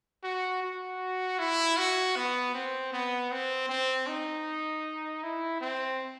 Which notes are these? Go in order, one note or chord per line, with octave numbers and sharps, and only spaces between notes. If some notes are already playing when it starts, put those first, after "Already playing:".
F#4
F#4
E4
F#4
B3
C4
B3
C4
C4
D#4
E4
C4